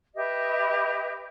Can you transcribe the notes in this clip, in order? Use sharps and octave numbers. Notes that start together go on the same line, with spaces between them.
G4 B4 D#5 E5